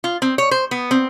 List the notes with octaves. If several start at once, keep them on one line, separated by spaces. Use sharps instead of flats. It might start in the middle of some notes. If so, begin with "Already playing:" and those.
F4
C4
C#5
C5
B3
C4